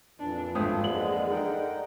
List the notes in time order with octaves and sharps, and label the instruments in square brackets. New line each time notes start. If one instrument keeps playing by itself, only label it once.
[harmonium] F2 A#2 E3 [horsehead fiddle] D4
[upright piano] G#1 G2 D#6 [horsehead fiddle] A3 [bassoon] C4
[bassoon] D3 [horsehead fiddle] G#3 [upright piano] F#7
[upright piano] D#4 [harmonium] A#4 F#5 G5